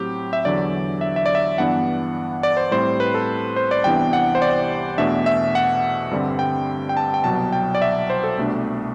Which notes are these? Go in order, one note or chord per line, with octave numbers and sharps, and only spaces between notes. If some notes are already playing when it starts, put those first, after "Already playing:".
Already playing: A2 F#3 C4 G4
E5
E2 D3 F#3 D5
E5
E5
D5
E5
G2 E3 B3 D4 F#5
D5
C5
A2 G3 C4 C5
B4
A4
C5
D5
C2 C3 E3 B3 D4 G5
F#5
C5
D5
E2 B2 A3 D4 E5
E5
F#5
G2 D3 G3 C4
G5
G5
A5
G5
C2 B2 F#3 A5
G5
D5
E5
C5
A4
C2 B2 A3 D4